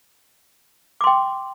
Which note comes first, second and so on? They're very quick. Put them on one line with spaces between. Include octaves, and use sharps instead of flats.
D6 C6 G5